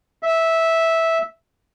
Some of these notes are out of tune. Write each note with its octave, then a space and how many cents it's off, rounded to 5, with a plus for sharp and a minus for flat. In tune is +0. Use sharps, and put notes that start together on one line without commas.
E5 -10